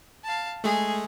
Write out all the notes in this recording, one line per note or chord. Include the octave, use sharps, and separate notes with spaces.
F5 A5
G#3 A3 G#4